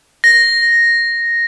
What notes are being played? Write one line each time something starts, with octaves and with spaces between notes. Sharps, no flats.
A#6